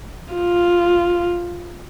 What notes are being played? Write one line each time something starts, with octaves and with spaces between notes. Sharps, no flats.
F4